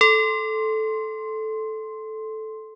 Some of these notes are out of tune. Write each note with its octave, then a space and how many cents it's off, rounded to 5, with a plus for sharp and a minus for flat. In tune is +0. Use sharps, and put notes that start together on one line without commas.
A4 -10 C6 +5